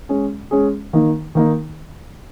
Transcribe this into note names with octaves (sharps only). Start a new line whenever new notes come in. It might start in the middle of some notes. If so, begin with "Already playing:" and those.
G#3 C#4 G#4
G#3 C#4 G#4
D#3 A#3 D#4
D#3 A#3 D#4